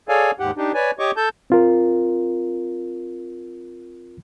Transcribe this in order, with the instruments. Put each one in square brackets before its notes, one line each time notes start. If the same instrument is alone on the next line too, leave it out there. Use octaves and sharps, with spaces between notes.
[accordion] G#4 A4 C#5 D5 F5 G#5
D#2 G#2 G4 F#5
D4 D#4 G4
B4 C#5 D5 G#5
G4 C#5 D#5 C#6 D6
A4 A5 G6
[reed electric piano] C4 F4 A#4